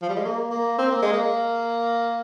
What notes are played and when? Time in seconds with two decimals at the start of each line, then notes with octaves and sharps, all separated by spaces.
0.02 F3
0.09 G3
0.17 G#3
0.25 A#3
0.51 A#3
0.78 C4
0.91 A#3
1.02 G#3
1.14 A#3